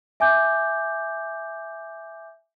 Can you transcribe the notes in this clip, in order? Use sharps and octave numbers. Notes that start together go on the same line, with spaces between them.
E5 G#5 D6 G6